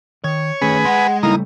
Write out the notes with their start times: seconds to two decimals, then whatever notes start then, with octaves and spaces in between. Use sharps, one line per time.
0.24 D#3 C#5
0.62 D#3 A3 C#4 G#4 B4
0.85 G#3 F#5 C6
1.23 C#3 G3 A3 A#3 D#4 E4